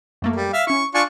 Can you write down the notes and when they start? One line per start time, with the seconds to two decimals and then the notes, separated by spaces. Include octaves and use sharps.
0.22 F#2 A3 A#3
0.36 G3
0.53 E5 F5
0.67 C#4 E4 C#6
0.94 D4 F4 G#5 C#6